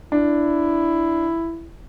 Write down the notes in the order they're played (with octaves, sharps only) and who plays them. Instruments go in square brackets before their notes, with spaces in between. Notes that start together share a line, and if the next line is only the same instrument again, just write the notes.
[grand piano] D4 [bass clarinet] E4